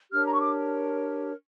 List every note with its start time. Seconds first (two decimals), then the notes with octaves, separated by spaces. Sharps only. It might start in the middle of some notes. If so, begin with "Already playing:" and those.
0.11 D4 G4 A#4 C#5 F6
0.24 A#5
0.31 C#6
0.40 D6